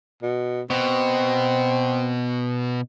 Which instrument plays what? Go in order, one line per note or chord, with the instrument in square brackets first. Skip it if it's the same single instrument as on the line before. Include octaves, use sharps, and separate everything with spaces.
[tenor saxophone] B2
[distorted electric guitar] B2 [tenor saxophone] C4